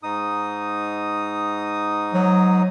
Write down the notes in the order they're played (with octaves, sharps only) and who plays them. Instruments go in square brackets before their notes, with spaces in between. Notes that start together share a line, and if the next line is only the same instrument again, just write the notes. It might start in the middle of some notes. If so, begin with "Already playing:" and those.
[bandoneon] G#2 D#4 D#6
[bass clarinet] F#3